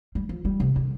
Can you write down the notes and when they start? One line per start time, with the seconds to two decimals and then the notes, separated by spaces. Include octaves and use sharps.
0.15 G3
0.29 F3
0.45 G3
0.60 C3
0.76 D3